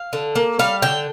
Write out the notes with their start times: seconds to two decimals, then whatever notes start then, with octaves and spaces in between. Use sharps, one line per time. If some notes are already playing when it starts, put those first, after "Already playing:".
Already playing: F5
0.13 D3
0.36 A#3
0.59 G3 F5
0.82 D3 G5